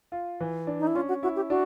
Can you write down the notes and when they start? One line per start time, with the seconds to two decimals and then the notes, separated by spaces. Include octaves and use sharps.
0.12 F4
0.40 E3
0.67 D4
0.80 D#4
0.87 E4
0.95 C#4 F4
1.09 F#4
1.23 E4 F#4
1.36 G4
1.50 D4 F#4